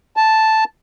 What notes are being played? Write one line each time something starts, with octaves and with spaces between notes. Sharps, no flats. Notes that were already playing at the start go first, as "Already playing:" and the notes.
A5